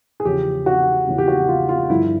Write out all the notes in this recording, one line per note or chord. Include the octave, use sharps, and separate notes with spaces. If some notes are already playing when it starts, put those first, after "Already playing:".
G#4
E2 C#3 F3 G4
F#4
E2 C#3 F3
G4
F#4
F4
F4
G2 D3 F3 E4